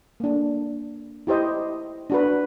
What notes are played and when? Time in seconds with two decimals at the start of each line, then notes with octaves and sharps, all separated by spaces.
0.20 A#3 D4
1.27 E4 G4 C5 D#5
2.10 D4 F#4 B4